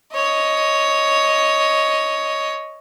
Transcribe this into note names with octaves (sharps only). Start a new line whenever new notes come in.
C#5 D#5